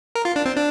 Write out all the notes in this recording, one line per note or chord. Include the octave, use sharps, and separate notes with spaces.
A#4
F4
D4
C4
D4